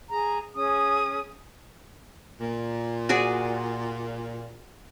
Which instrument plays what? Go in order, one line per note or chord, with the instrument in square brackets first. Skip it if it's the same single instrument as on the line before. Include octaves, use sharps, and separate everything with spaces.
[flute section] G#4 A#5
C#4 G#4 D#6
[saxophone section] A#2
[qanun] F#4 G#4 D5